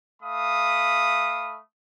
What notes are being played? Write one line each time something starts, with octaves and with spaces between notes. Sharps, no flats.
A3 F5 B5 D#6